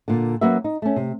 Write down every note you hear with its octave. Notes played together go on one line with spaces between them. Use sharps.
A#2 D3
F#3 A#3 C#4 F#4 B4 E5
D#4
A3 C#4
C3